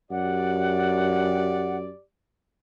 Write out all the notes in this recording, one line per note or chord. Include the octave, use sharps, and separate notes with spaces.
F#2 G4 D5 F#5